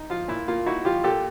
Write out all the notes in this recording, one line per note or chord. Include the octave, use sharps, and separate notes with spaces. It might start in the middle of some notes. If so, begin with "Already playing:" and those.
Already playing: D#4
F3 F4
A#2 E4
A#3 F4
D#4 E4 F#4
F3 F4 G4
A#2 G4 A4